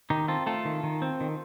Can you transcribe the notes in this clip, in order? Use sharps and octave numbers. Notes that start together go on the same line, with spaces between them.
D#3 D#4 G4
C4 F4 A4
A3 F4 A4
D#3
D#3
C4
D#3